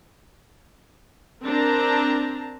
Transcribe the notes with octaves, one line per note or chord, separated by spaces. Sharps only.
C4 D4 A#4 A5 A#5